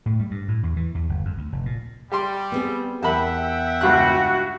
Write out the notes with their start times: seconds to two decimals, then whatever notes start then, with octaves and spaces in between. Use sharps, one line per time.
0.06 A2
0.19 G3
0.31 G2
0.48 A2
0.63 E2
0.77 E3
0.95 E2
1.09 G1
1.25 F2
1.37 D2
1.52 F1
1.66 A#2
2.12 G3 G4 C6
2.52 B3 C4 G#4
3.02 E2 G4 A#4 E5 F#5 G5 A5 B5
3.81 C#2 G2 F#4 F#6